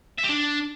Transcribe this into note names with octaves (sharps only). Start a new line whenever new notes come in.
E5
G4
D4